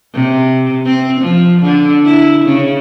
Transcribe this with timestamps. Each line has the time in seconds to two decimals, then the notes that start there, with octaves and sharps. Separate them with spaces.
0.13 C3
0.85 C4
1.21 F3
1.62 D3
2.04 E4
2.45 C#3